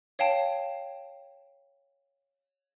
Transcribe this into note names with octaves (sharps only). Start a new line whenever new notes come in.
C#5 F5 G5 A5